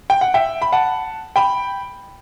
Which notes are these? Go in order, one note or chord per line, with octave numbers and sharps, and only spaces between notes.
G5
F#5
E5 G5
B5
F#5 A5
G5 B5